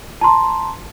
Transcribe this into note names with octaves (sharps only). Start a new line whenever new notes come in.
A5 A#5 C6